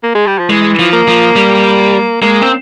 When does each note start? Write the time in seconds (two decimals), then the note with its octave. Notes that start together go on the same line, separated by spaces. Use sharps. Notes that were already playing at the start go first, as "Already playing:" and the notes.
0.03 A#3
0.15 G#3
0.27 G3
0.39 F3
0.50 E3 G#3
0.79 F3
0.93 A#3
1.08 F3
1.36 G3
2.22 G#3 A#3
2.42 C4